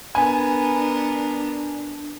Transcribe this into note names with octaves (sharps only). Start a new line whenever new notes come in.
B3 D4 A#4 G#5